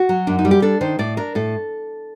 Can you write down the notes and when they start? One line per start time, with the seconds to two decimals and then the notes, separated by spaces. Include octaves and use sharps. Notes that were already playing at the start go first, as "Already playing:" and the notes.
Already playing: F#4
0.09 F#3
0.27 F#2 D4
0.39 D#4
0.45 G3
0.51 G4
0.62 D4 A4
0.81 D#3 C5
0.99 A2 D5
1.17 D4 A#4
1.35 A2 A4